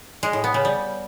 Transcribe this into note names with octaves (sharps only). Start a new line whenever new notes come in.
G#3
A2
B3
C#3
G3